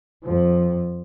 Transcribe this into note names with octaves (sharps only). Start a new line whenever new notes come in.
F2 F3